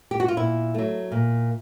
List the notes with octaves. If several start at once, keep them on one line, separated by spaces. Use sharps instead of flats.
G4
F#4
F4
A#2 E4
F#3 A3
A#2